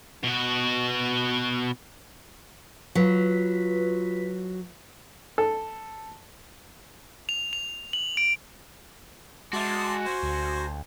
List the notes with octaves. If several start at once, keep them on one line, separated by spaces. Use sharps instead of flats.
B2 F#4
F#3 F4 B4 B6
A4
F7
F7
F#7
D7
G#3 F#4 E5 A5 C6 D6
C5 G#5
D2